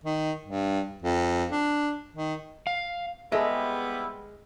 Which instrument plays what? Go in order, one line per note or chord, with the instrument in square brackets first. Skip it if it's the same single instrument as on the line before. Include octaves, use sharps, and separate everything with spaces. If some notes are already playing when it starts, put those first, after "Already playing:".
[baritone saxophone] D#3
G2
F2
D4
D#3
[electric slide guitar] F5
[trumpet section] G3 C4 E4 [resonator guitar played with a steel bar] G#3 [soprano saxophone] B3 [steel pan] G#4 A4 E5